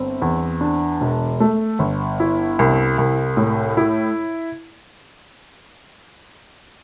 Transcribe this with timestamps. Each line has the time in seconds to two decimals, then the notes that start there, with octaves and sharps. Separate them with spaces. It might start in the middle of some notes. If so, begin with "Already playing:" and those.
Already playing: G1 C4
0.22 E2
0.61 D4
1.01 E1
1.40 A3
1.79 G1
2.20 E4
2.59 C2
2.98 C2
3.37 A2
3.77 E4